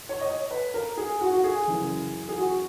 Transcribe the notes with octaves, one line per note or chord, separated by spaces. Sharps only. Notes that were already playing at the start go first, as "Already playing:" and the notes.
Already playing: A#2
C#5
D#5
C#5
B4
A#4
G#4
F#4
F#4
G#4
F#2 C#3 E3
G#4
F#4